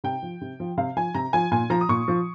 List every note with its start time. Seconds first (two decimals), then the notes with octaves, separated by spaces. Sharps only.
0.04 C3 G5
0.22 F3
0.41 C3
0.60 F3
0.77 C3 F5
0.96 F3 G#5
1.14 C3 A#5
1.33 F3 G#5
1.51 A#2 G#5
1.70 F3 A#5
1.81 D#6
1.89 A#2 C#6
2.08 F3